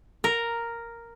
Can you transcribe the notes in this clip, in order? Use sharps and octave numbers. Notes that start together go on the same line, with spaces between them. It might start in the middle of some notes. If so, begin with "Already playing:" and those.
A#4